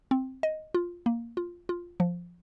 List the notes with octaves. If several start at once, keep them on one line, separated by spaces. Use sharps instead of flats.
C4
D#5
F4
A#3
F4
F4
F3